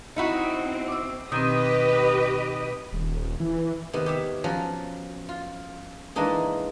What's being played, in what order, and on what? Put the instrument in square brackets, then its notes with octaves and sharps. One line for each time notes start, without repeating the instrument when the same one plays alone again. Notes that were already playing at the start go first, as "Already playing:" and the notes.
[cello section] C4 [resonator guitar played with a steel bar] D#4 E4 F#4
[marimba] D6 E6
[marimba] B2 C4 [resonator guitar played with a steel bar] D#3 [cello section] G4 B4 D#5
[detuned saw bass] D#1
E3
[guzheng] C3 D#3 B3
G4 C#5 E5
F3 F#3 C#4
F4
E3 G#3 A#3 D4 D#4 G#4